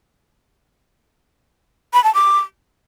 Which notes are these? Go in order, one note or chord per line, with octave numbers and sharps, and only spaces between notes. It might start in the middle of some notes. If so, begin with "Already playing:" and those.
B5
A5
D6